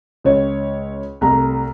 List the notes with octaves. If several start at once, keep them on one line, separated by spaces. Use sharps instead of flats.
C#2 C#5
C2 A3 A#5